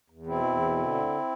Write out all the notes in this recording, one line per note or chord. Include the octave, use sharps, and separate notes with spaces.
E2
B2 C4 E4
E2
B2
D3
D2